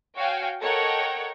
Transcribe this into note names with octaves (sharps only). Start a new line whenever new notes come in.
F#4 C#5 F5 G5 G#5
A4 A#4 C#5 D#5 F#5 G5